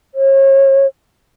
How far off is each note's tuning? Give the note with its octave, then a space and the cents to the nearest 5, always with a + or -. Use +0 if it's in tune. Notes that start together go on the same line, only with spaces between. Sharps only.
C#5 -35